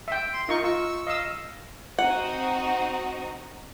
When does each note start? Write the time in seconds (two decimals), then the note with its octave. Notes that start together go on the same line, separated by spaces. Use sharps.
0.08 E5 G5
0.33 C6
0.49 D#4 F4 A#4 C#6
0.64 F4 C#6 E6
1.07 D#5 F5 E6
1.99 C4 D#4 F#4 F#5